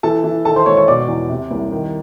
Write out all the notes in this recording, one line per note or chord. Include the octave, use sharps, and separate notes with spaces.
E3 A4 A5
E3
D#3 A4 A5
C5 C6
G#2 C#5 C#6
C#5 C#6
B2 D5 D6
E2
C3
C2
D#3